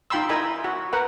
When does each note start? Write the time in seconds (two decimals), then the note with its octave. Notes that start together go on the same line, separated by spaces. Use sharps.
0.10 D#4 F4 G5 B5 C6 E6
0.29 E4 A#4 D#5 G#5 B5
0.64 F#4
0.93 A#4 B4 F#5